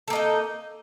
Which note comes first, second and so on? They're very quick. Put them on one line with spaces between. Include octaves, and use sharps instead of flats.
A4 A#3 D#5 D#4